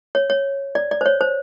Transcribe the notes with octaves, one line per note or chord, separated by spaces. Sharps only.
C#5
C#5
D5
D5
C5
C#5
C5